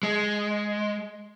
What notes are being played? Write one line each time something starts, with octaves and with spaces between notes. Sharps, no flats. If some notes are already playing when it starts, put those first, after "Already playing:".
G#3